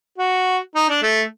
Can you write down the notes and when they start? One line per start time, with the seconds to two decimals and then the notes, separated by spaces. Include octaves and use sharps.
0.18 F#4
0.75 D#4
0.89 D4
1.02 A3